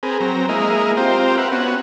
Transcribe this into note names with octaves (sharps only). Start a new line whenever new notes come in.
C4 G#4 A#4 B4
F#3 C4 A#5
G#3 A#3 E4 A#4 D#5
C4 F4 G4 A#4 C5
A#4 B4 E5 F#5
B3 C#4 F#4 F#5